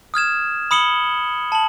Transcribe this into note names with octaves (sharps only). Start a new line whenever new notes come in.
D#6 F6 G#6 E7
B5 D#6 C#7 F#7 G7
A5 F#7